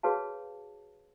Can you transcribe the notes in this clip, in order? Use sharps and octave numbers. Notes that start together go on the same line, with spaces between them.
F#4 G#4 B4 C#5 F5 A5